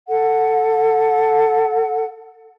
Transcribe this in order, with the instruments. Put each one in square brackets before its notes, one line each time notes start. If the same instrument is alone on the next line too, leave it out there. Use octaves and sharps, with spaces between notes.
[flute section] A4 F#5